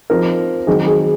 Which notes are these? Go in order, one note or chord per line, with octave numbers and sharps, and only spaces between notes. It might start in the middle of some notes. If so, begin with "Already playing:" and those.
F3 C4 D#4 A#4
D#3 F#3 C4 D#4 G#4
G#4